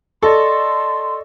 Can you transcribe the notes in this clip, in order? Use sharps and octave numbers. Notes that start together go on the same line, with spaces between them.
A4 D5 D#5 C6 C#6